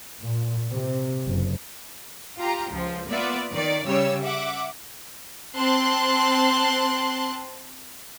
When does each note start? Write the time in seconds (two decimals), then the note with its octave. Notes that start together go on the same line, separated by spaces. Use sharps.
0.22 A#2
0.71 C3
1.26 F#1
2.39 F4 G4 A#5
2.73 C#2 F3
3.10 A#3 B3 F4 B4 D5 E5
3.52 D#3 D5
3.86 C#3 G3 G4 C#5 E6
4.22 E5 F#5 D6
5.56 C4 A5 C6 F#6